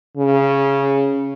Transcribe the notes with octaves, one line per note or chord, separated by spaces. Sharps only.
C#3